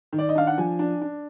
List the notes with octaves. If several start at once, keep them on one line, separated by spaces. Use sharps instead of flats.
D#3
D5
D#5
D4 F5
F#5
F3 G#5
D4
D4